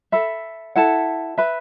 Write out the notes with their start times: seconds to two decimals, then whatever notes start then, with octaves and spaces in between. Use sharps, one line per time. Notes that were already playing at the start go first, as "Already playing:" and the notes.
0.12 A4 E5 B5
0.75 E4 A4 F#5 A5
1.38 B4 E5 B5